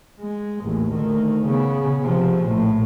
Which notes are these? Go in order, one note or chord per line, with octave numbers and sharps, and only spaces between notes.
G#3
A1 D#2
D2 D#3
C#3 B3
C3 F3
A#1 A2